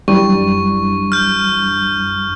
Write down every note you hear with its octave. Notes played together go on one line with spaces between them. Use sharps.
F#2 E3 G3 D4 C#6
F6 G6